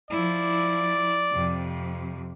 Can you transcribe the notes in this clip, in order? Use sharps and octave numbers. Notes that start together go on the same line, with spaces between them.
F3 E4 D5
F2 C3